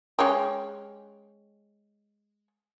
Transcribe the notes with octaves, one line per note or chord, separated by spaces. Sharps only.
G#3 C#4 G4